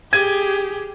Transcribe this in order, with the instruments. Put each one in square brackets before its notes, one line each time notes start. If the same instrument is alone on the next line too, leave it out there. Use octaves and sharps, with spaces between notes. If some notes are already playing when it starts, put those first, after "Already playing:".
[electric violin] G4 G#4 [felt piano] G#6 D#7